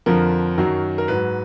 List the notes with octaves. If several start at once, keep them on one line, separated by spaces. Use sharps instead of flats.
F2 D3 F3 A#4
F#2 D#3 F#3
A#4
G#2 F#3 B4